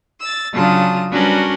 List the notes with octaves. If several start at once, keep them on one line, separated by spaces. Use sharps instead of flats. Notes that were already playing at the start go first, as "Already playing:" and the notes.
E6 A6
C#3 F#3 D4 F4 A5 D#6
G3 C#4 D4 F#4 A#4 B4